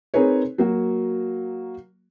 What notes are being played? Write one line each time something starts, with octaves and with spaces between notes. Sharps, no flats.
C4 D#4 G#4 A#4 B4 C#5
F#3 A#3 F#4